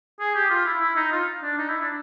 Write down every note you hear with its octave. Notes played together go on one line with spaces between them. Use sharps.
G#4
G4
F4
E4
E4
D#4
F4
D4
D#4
E4
D4